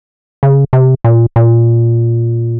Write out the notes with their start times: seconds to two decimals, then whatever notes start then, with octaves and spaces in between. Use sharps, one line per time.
0.43 C#3
0.73 C3
1.04 A#2
1.36 A#2